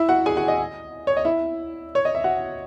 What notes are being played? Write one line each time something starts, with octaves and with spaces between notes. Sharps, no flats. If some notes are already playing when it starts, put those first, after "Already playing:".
Already playing: E4 E5
F#4 F#5
G#4 G#5
F#4 F#5
D#5
C#5
D#5
E4 E5
C#5
D#5
E5
F#4 F#5